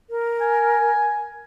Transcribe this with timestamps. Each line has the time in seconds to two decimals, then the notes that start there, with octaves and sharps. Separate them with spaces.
0.10 A#4
0.41 G#5